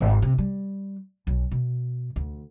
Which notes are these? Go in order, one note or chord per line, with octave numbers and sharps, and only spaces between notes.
G#1
C3
G3
B1
B2
D2